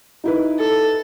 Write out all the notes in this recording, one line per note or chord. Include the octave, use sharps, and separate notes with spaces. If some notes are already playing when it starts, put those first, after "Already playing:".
D#4 E4 B4
A4